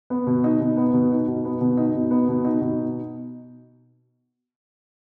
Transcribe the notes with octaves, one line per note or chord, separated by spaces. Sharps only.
B3
B2
D#4
B2
B3
B2
D#4
B2
B3
B2
D#4
B2
B3
B2
D#4
B2